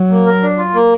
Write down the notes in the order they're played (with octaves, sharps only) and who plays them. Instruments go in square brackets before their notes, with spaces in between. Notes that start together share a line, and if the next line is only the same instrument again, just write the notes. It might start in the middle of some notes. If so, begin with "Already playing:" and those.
Already playing: [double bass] F#3
[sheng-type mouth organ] A#3
A#4
D4
F4
A#3